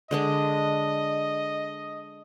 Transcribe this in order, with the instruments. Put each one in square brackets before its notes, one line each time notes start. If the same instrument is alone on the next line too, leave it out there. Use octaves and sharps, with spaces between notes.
[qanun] D3 G#3 D4 [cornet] D#5